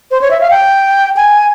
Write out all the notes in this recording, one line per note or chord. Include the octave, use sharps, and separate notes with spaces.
C5
C#5
E5
F5
G5
G#5